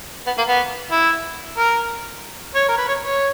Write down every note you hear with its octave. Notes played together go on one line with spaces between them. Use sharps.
B3
A#3
B3
E4
A#4
C#5
A#4
B4
C#5
C#5